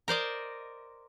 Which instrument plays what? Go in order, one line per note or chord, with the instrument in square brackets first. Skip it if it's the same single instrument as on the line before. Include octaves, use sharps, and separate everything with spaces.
[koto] A#4 C5 D5 D#5